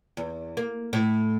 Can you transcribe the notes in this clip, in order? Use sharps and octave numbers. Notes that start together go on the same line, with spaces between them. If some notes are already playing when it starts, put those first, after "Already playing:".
E2
A#3
A2